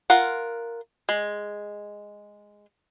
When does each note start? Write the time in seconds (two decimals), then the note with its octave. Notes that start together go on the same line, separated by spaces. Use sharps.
0.10 F4 A#4 F#5
1.09 G#3